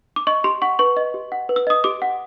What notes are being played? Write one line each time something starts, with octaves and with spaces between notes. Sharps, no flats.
D6
D#5 C#6
G4 C6
F#5 C#6
B4 C#6
D#5
G4
F#5
B4
E6
D#5 D#6
G4 D6
F#5